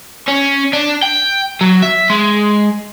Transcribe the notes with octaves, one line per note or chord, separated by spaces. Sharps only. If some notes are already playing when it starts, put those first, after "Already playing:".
C#4
D4
G5
F#3
E5
G#3